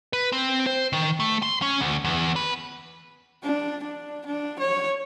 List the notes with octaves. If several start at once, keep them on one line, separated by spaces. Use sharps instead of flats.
B4
C4
C5
D#3
A3
C6
C#4
D2
E2
B4
D4
D4
D4
C#5